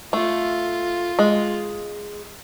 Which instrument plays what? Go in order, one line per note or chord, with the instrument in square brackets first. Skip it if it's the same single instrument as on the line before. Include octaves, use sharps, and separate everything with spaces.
[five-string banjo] A3 [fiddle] F4
[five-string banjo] G#3